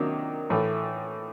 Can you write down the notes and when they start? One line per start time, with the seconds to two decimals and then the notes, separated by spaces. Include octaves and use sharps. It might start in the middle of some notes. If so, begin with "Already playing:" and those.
Already playing: C3 D#3 F#3 A#3 D4
0.50 A2 E3 A3